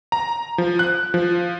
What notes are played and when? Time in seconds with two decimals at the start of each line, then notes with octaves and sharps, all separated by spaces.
0.12 A#5
0.58 F3
0.79 F#6
1.14 F3